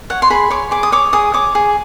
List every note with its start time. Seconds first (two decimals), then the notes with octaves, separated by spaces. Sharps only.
0.10 C#5 F#5
0.22 C6
0.30 G#4 B5
0.50 C#5 D6
0.71 G#4 D6
0.83 D#6
0.92 C#5 D6
1.13 G#4 D#6
1.34 C#5 D6
1.55 G#4